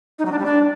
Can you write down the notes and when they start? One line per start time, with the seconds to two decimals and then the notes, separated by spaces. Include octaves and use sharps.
0.19 D#4
0.25 F#3
0.32 D4
0.39 G3
0.45 D4